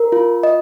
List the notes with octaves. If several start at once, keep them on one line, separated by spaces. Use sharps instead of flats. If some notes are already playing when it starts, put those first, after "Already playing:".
Already playing: A#4
F4
D#5